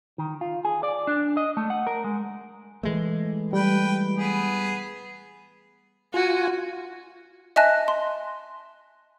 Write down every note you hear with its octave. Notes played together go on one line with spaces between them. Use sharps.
D#3
F4
G#4
D5
D4
D#5
A3
F#5
A#4
G#3
E3 G#3 A3
G3 B4 G5
B3 G#4
F4 F#4 G#5
D#5 E5 G#5 A5 F#6 A#6
C6